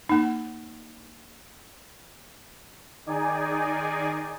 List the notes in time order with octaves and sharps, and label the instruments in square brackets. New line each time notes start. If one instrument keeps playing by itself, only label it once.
[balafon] A#3 D#4
[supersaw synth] D#3 D#4 G#4 D5 G#5